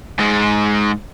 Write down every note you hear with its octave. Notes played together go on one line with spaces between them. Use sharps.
G#2 G#3